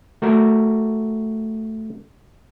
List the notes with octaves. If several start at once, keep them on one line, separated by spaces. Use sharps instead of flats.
A3 F#4 A#4